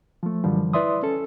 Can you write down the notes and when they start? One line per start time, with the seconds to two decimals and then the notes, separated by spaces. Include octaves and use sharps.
0.23 F3 A3
0.44 F#2 D3 E3 F3 G3
0.73 E4 B4 D5 E5 C6 D#6
1.03 C#4 A4